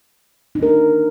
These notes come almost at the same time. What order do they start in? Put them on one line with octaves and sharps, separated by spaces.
D#4 D4 A#4